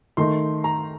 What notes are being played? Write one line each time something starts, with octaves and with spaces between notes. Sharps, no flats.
D#3 A3 D#4 C6
A#5